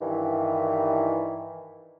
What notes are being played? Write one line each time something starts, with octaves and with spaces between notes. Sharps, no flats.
G2 D#3 E3